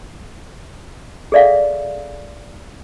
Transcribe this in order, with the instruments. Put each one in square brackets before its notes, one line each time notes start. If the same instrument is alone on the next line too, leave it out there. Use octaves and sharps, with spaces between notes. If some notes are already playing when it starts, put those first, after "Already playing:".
[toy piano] G#4 A4 D5 E5 F5